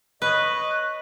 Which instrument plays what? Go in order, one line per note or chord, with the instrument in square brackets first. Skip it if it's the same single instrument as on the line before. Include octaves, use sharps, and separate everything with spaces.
[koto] B4 [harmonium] C#5 D#5